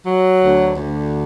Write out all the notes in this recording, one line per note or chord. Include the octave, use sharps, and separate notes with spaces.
F#3
D2
D2